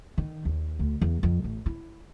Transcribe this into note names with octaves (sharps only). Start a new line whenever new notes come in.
D#3
D#2
D2
E2
F2
A1
E4